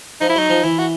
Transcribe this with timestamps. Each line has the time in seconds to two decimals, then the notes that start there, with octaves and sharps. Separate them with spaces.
0.21 F3 D#4
0.29 E4
0.35 F#3 D#4
0.49 F3
0.64 E3 E4
0.78 F#4